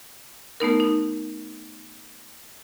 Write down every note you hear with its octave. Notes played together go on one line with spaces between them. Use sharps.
A3 B3 D#4 A#4
D#4